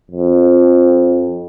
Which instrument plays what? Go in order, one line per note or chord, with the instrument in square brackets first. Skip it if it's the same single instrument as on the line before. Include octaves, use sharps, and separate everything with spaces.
[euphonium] F2